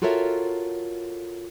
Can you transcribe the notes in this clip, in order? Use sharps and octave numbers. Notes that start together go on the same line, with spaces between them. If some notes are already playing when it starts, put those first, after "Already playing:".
F4 F#4 A4 A#4 C#5 E5